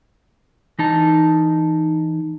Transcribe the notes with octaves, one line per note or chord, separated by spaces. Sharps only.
E3 D#4 A5